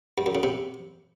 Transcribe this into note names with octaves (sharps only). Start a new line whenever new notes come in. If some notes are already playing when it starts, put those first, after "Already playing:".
G2
F#2
C#3
C3